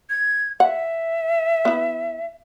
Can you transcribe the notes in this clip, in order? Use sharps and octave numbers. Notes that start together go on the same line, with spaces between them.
G#6
E5 F#5
B3 E4